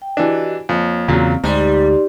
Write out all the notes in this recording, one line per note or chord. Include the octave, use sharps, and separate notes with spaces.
G5
E3 D4 F#4 G4 D#5
F2 A#3 C#5
E2 A#2 C#3 F#3 C4 F5
D2 G#2 G3 D#4 D5 C6